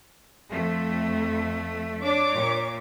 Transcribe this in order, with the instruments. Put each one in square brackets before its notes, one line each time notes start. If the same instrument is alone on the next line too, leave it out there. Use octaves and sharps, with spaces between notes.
[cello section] F2 A3
[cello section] D4 [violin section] C#5 D6
[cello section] A#2